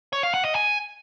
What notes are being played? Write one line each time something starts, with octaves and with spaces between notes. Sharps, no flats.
C#5
F5
F#5
D#5
G#5